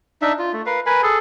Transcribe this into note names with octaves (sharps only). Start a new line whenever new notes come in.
D4 D#4 E5
F4
A3
A#4 B4 F5
A#4 B4 G#5 B5
G#4 A4